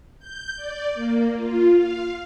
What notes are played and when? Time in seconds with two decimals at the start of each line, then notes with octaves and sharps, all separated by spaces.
0.19 G6
0.57 D5
0.94 A#3
1.36 F4
1.74 F5